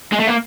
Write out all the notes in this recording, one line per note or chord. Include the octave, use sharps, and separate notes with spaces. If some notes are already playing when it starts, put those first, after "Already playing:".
G#3
A3
A#3